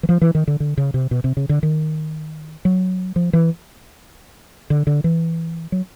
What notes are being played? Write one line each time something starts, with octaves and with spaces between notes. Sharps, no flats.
E3
F3
E3
D#3
D3
D3
C#3
C3
B2
C3
C#3
D3
D#3
F#3
F3
E3
D3
D3
E3
F#3